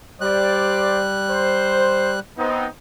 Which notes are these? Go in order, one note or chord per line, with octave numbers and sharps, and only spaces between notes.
G3 G4 C5 D5 F#6
C5
B3 C4 D#4